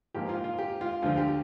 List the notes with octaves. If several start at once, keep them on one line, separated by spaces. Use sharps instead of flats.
G#2 F3 A#3 G4
F4
F4
G4
F4
D2 D3 F3 F4
G4